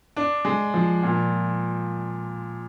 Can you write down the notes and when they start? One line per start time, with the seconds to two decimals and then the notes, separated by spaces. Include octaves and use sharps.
0.17 D4
0.45 G#3
0.74 F3
1.03 A#2